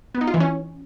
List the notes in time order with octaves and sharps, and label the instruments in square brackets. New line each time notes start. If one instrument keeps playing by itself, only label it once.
[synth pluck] B3
D#4
F4
E3
C#4